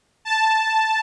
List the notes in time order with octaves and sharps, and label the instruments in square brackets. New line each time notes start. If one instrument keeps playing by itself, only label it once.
[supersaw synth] A5